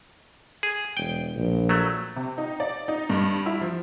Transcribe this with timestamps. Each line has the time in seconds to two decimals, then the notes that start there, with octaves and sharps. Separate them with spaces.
0.63 G#4
0.97 E1 G5
1.35 A#1
1.69 F#3 A3
2.16 C3
2.38 D#4
2.60 D5
2.88 D#4
3.10 G2
3.46 E4
3.61 F3